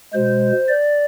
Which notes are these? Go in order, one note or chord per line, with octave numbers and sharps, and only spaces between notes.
B2 G#3 C5
D5